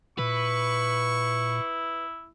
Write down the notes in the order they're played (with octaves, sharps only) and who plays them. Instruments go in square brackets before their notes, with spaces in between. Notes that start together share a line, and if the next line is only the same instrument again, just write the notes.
[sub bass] A#2 [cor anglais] E4 [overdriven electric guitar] B4 [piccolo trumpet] C#6